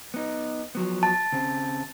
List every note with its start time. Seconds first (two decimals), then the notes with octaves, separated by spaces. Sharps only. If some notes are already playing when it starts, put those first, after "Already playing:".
0.14 B3 D#4
0.75 F3 F#3 B3
1.03 A5
1.32 C#3 C4